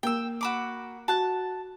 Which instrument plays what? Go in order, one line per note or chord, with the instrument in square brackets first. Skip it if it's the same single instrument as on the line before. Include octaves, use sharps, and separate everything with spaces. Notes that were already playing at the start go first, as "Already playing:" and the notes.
[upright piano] A#3 [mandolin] G5 E6
[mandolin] F#4 B5 D6
[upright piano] F#4 [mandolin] A5 F#6